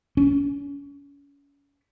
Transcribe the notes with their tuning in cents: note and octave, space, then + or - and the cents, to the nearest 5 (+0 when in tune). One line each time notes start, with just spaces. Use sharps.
C#4 +35